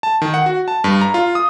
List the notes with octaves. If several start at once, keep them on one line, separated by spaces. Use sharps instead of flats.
A5
D#3
F#5
F#4
A5
G2
A#5
F4
D#6